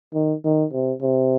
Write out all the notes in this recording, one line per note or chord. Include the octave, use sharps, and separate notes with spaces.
D#3
D#3
C3
C3